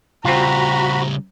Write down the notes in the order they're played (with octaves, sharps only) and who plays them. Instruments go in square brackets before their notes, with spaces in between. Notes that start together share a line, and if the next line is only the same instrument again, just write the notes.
[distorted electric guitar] C#3 G3 [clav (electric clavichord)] C4 F4 [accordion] F#4 B5 [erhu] A#5